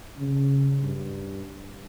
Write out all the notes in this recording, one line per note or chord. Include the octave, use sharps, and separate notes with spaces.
C#3
G2